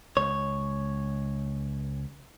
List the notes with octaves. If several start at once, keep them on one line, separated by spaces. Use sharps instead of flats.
C#2 C#5